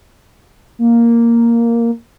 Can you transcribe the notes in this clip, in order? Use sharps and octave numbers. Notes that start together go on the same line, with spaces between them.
A#3